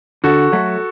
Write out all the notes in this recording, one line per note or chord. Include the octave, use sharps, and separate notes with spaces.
D3 F#4 A4
F#3 A3